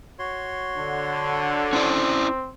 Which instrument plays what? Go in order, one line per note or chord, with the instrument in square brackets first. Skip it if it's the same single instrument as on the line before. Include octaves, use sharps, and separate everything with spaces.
[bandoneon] F#4 C#5 C6
[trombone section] D3
[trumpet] C4 [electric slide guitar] C#4 E4 D5